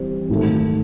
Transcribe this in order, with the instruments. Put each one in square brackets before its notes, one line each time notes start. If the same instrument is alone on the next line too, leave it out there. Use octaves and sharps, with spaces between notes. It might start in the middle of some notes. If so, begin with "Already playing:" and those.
Already playing: [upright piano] E3 G3 C4
G#2 D#3 F#3 A3